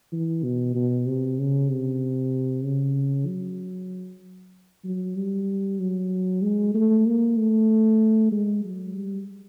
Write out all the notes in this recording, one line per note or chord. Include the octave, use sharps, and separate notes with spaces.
E3
B2
B2
C3
C#3
C3
C#3
F#3
F#3
G3
F#3
G#3
A3
A#3
A3
G#3
F#3
G3